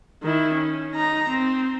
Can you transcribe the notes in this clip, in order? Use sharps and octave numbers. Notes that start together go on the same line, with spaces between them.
D#3 E4
C#4
D#4 A#5
C4